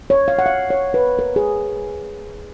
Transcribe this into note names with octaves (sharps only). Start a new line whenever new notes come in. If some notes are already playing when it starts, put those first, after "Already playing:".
C#5
F5
F#5
F5
C#5
B4
A#4
G#4